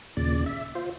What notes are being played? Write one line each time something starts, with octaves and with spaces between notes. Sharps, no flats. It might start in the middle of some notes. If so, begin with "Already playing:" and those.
D#2 A#2 C#3 D5
E5
F4 C5